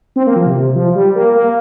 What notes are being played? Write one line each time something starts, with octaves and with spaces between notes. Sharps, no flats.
C4
A#3
F3
C3
C3
F3
G3
A#3
A#3